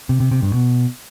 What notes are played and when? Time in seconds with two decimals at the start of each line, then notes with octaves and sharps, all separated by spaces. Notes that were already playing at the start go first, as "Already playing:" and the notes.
0.09 C3
0.20 C3
0.31 C3
0.42 G2
0.53 B2